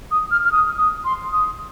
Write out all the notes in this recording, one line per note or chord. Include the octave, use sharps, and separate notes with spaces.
D#6
F6
F6
D#6
D#6
C6
D#6